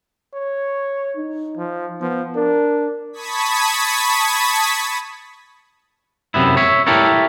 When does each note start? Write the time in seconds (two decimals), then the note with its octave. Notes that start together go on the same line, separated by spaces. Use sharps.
0.34 C#5
1.17 D#4
1.57 F3
2.02 F3 B3
2.36 D4 A#4
3.13 A5 B5 C#6 D#6 G#6 B6
6.34 F#2 C3 B3 E4
6.57 C#5 E5
6.87 E4 G4 A4 A#4 C#5